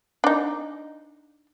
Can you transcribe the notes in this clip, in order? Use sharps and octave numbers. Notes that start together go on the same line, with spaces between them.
D4 D#4